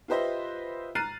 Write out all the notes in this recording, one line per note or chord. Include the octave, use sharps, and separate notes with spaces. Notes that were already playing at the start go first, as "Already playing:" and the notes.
F4 G4 B4 C5 D#5 E5
A#5 F6 F#6 A6 C7 D#7